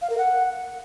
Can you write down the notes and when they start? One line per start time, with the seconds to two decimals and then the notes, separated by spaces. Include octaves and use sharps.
0.01 F5
0.10 A#4
0.18 F#5